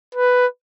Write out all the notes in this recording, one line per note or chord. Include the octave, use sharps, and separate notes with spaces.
B4